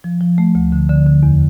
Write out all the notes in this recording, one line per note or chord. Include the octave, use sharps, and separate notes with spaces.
F3
F3
A3
D2
D3
D3
D3
E2